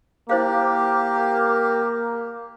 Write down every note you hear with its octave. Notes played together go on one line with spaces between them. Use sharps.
A#3 E4 G4 C5 F5